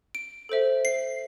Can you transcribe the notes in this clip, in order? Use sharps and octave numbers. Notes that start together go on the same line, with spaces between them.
D7
A4 C5 E5
C7